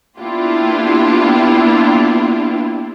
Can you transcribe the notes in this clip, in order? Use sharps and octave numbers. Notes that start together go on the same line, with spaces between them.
A#3 B3 D4 E4 F4 G4